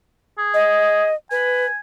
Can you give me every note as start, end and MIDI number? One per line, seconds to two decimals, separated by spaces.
0.38 1.06 68
0.54 1.14 75
1.31 1.66 71
1.31 1.78 80